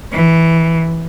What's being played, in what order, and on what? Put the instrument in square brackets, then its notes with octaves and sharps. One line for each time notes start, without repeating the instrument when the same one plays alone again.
[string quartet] E3